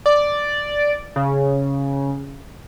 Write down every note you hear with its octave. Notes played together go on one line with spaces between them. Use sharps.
D5
C#3